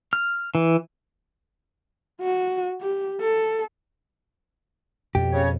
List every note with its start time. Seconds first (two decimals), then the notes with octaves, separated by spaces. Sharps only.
0.13 F6
0.55 E3
2.21 F#4
2.81 G4
3.21 A4
5.15 F2 B2 G4
5.32 C#3 C#5